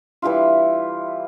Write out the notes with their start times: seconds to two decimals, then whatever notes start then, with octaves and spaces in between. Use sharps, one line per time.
0.22 E3 G3 E4 F4